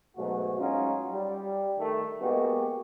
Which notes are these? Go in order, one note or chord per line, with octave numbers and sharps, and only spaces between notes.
G#2 B2 F#3 A3 F#4
F#3 G#3 C#4 D#4 F4 F#4
G3
D#3 A3
G#3 A#3 B3 F#4 G4